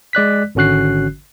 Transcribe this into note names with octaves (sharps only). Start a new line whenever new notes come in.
G#3 D5 F#6 B6
G#1 D3 C#4 F#4 F#6 C7